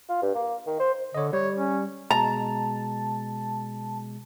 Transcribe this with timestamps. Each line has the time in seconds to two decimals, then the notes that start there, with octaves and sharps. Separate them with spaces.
0.09 F4
0.22 G2
0.35 A#3
0.67 D#3
0.80 C5
1.15 D3 C#5 D#5
1.33 G3 C#5
1.56 C#4
2.11 B2 G#3 A5 A#5